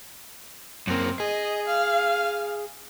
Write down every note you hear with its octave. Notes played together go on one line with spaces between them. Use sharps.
F#2 A#3 C4
G#4 D#5
F5